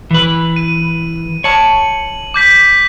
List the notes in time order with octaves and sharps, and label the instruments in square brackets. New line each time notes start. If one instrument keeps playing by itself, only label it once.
[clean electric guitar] E3 B4
[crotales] D#7
[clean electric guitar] C#5 A5 [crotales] F#7
[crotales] D6 G6 B6